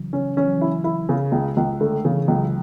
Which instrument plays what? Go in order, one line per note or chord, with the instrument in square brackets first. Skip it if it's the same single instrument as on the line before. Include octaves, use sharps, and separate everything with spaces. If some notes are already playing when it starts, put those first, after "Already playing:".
Already playing: [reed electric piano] C#3 E3 F#3
[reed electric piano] C#3 [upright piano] C#4
[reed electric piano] E3 [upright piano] C#4
[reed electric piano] F#3
E3
[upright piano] E4
E4
C#3
C#2
C#2
[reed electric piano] D3 [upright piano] A3
[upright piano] C#3 [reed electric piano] E3
[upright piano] C#2 [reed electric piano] F#3